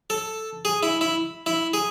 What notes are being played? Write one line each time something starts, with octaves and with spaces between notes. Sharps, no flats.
A4
G#4
E4
E4
E4
G#4